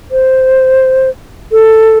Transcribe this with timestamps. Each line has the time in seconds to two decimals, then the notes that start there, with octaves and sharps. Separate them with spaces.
0.11 C5
1.52 A4